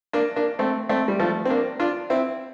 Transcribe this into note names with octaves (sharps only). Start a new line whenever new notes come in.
A#3 D4
A#3 D4
A3 C4
A3 C4
G3
F3 A3
C4
A#3 D4
D4 F4
C4 E4